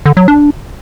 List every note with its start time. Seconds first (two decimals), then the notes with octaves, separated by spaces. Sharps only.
0.06 D3
0.17 F#3
0.28 D4